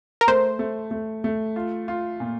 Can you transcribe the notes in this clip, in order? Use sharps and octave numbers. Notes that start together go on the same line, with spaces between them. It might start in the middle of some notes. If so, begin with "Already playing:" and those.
A#4
A3 C5
A3
A3
A3
F4
F4
A#2